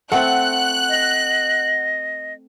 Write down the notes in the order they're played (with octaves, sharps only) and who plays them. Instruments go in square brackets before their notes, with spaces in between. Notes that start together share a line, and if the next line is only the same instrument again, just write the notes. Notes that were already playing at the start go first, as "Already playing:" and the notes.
[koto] A3 C4 [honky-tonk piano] F#5 [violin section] F#6
[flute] D#5